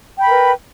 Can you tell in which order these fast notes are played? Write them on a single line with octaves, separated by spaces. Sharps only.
G5 B5 A#4 B4